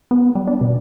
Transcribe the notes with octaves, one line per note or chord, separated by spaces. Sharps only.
B3
G3
D4
B2